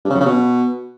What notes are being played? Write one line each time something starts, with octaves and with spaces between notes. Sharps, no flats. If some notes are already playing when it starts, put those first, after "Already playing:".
G2
C#3
F#2
C#3
B2